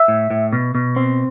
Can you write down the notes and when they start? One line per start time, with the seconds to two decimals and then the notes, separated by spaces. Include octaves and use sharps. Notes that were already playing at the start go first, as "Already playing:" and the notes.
Already playing: E5
0.08 A2
0.31 A2
0.52 B2
0.75 B2
0.96 C4